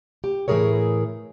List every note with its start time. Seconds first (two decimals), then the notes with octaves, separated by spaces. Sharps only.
0.24 G4
0.48 A2 E3 A3 G#4 A#4 C#5